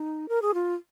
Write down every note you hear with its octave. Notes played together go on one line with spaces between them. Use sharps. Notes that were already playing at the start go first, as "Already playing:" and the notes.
Already playing: D#4
A#4
G#4
F4